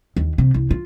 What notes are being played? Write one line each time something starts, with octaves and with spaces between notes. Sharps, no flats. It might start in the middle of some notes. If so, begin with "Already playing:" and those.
D#2
C3
C2
F4